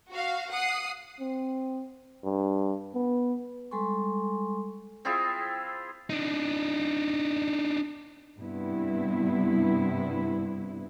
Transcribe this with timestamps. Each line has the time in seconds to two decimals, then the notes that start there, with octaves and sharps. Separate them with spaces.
0.11 F#4 F5
0.51 F#5 D#6 C7
1.20 C4
2.24 G2
2.94 B3
3.71 G3 G#3 A4 G#5 C6 C#6
5.05 C4 E4 F4 G#4
6.10 D4 D#4
8.40 G2 C3 B3 E4